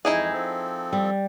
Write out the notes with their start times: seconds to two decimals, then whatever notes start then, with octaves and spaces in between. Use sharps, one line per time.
0.05 F2 E3 G#3 D#4 E4 G#4
0.33 F3 C4 A4
0.93 G3